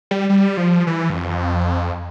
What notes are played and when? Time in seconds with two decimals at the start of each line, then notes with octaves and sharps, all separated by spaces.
0.11 G3
0.29 G3
0.57 F3
0.87 E3
1.10 G2
1.14 F2